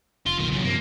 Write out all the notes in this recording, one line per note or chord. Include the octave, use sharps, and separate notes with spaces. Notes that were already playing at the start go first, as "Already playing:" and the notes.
F1 F4
B1 A#2 D#3
C#3 F#3
G2 C3 F3 A#3